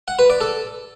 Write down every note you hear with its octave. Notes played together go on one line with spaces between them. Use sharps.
F#5
B4
D5
A4